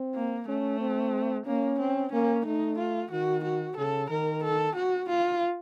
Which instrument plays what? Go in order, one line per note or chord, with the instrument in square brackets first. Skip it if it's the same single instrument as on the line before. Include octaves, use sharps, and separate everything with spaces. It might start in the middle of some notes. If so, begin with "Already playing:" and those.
Already playing: [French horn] C4
[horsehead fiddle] A#3
[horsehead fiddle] A3 [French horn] C#4
[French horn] C4
[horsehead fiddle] A#3 [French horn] C#4
[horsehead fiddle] C4
[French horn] A#3 [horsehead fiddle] C#4
[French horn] A3 [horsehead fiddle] D#4
[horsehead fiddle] F4
[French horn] D#3 [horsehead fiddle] F#4
[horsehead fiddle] F#4
[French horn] C#3 [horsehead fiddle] A4
[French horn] D#3 [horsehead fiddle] A#4
[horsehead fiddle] A4
F#4
F4